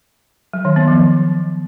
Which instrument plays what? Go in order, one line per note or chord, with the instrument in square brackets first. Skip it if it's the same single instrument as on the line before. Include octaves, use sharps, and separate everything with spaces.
[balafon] F#3
D#3
B3
F3